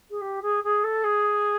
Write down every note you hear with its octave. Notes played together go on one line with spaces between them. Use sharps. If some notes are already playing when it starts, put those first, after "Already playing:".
G#4
G4
G#4
G#4
A4
G#4